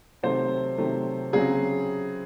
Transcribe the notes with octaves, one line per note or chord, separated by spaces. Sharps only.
C3 D#3 F#3 A3 C5
C3 D#3 F#3 A3
C#3 F#3 C4 G#4